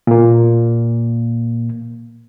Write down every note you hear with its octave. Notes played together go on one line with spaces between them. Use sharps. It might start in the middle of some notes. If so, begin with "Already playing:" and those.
A#2 A#3